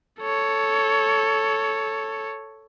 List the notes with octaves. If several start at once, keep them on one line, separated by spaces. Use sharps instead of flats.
A4 C#5